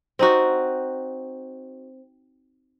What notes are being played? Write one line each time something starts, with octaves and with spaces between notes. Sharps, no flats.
C4 D#4 F#4